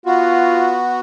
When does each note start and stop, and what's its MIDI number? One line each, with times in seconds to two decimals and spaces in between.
0.06 1.01 59
0.06 0.82 65
0.06 1.01 66